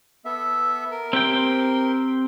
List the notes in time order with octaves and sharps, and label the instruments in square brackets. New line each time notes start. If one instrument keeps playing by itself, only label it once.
[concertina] B3 A4 E5
A#4
[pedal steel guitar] C4 G4 G5